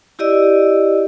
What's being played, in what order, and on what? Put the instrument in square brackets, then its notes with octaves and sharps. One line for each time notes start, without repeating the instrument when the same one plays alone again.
[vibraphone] E4 G4 D5 D#5 E6